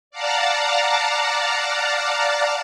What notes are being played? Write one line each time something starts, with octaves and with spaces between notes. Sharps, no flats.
D5 F5 F#5 A5 A#5